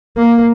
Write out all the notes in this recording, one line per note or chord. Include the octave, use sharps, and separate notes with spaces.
A#3